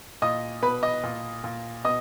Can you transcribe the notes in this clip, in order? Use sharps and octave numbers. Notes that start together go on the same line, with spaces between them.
A#2 D#5 D#6
B2 B4 B5
D#5 D#6
A#2
A#2
B2 D#5 D#6